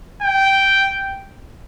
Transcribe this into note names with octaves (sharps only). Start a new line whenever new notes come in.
G5